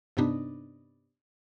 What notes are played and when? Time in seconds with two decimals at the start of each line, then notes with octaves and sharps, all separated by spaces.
0.17 G2 C3 B3 D4 D#4